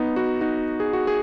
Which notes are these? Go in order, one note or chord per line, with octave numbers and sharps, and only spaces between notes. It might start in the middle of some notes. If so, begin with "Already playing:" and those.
Already playing: B3 D#4
D#4 F#4
D#4 F#4
G#4
F#4
G#4